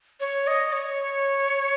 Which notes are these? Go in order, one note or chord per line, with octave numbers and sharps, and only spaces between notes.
C#5
D#5
C#5